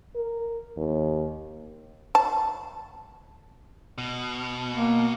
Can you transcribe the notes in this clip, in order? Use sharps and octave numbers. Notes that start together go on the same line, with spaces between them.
A#4
D#2
A5
B2
A#3